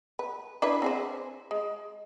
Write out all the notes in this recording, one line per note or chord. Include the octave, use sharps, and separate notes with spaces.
B4
D4 E4 B4
C4 G#4 C5
G#3